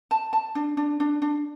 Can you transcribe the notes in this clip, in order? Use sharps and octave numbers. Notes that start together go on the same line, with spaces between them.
A5
A5
D4
D4
D4
D4